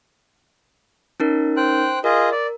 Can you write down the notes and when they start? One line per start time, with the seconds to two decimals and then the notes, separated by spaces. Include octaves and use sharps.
1.20 C#4 D#4 A#4
1.57 C5 G5 F#6
2.04 F4 G#4 A#4 D#5
2.32 D5